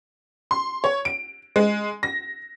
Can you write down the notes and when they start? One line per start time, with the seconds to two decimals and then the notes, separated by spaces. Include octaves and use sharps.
0.51 C6
0.84 C#5
1.05 D7
1.56 G#3
2.03 A#6